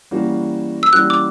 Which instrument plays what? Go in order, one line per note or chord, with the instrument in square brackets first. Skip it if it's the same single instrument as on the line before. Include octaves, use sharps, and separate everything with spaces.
[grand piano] E3 G3 A#3 C#4 F#4
[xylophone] E6
[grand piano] E3 G3 A#3 C#4 F#4 [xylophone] F#6
[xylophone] D6